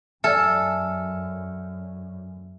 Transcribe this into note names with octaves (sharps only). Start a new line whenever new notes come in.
F#2 A4 D5 E5 G#5 F6